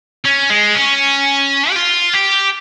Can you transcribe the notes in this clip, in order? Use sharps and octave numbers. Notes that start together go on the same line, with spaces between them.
C#4
G#3
C#4
G4
F4
G4